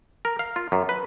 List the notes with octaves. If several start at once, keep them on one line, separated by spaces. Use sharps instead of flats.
A#4
F5
F4
F#2
B4